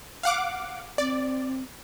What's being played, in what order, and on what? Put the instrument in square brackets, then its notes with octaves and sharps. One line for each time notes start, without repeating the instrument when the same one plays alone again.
[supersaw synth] F5 F#5 D6
[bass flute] C4 [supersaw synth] D5